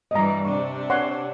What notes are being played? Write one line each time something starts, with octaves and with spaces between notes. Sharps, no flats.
G2 E3 G3 D#5 A#5
C3 D4 C#6
C#5 F#5 C6